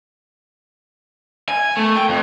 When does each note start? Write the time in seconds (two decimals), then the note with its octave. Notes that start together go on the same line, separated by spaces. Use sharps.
1.49 G#5
1.77 A3
1.96 G5
2.09 F2